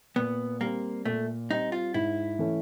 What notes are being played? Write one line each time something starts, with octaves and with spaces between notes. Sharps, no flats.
A#2 B3
G3 A#3 C4
A#2 A3
G3 C4 D#4
F4
G#2 E4
E3 A3 C#4